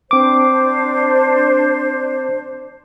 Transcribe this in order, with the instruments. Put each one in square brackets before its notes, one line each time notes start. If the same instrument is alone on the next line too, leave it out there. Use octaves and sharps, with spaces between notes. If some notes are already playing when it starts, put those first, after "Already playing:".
[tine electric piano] C4 D6 [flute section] D4 C5